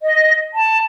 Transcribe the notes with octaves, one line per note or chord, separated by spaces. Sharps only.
D#5
A5